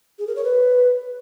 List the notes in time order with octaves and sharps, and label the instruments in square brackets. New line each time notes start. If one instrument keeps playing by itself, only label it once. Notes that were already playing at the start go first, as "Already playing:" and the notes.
[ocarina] G#4
A#4
C#5
B4